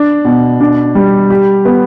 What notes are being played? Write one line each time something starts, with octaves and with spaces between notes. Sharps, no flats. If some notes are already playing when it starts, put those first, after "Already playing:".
Already playing: D4
B2
D4
G3
G4
B3